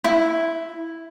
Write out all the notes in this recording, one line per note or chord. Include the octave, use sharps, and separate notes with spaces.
E4